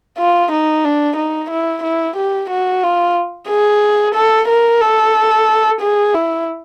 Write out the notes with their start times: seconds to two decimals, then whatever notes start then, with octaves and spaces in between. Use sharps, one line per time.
0.18 F4
0.52 D#4
0.85 D4
1.17 D#4
1.51 E4
1.83 E4
2.17 G4
2.50 F#4
2.83 F4
3.48 G#4
4.15 A4
4.48 A#4
4.81 A4
5.81 G#4
6.14 E4